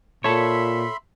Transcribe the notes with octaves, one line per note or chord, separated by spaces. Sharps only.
A#2 A4 C#5 E5 B5 C6